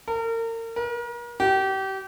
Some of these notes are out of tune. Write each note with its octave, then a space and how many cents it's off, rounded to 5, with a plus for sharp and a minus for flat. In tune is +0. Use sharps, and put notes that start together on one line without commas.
A#4 -35
A#4 +40
G4 -30